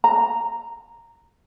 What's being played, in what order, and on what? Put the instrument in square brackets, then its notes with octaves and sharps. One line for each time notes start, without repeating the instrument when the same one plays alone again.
[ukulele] A#5